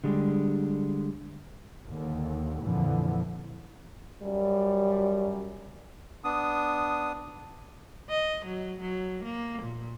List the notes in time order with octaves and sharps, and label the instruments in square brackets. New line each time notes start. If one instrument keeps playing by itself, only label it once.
[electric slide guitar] D3 G3 G#3
[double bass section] D#2 D3
F2 A#2 D3 E3 F3
[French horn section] F#2 G3
[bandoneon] B3 D4 D#6
[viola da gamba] D#5
F#3
F#3
A#3
A#2